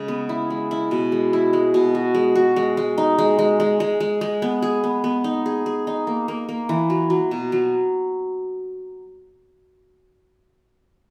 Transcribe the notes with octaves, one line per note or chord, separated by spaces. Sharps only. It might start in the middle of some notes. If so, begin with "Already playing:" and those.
Already playing: C#3 G#3
B3
E4
G#3
E4
B2
G#3
E4
G#3
B2
F#4
G#3
F#4
G#3
G#3
D#4
G#3
G#3
G#3
G#3
G#3
G#3
B3
G#4
B3
B3
D#4
G#4
G#4
D#4
A#3
A#3
A#3
E3
F#3
F#3
B2
F#3